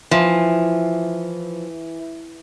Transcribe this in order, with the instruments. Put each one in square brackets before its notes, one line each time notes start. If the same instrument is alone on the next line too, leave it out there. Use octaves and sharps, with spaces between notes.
[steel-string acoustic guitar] E3 [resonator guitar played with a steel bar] F3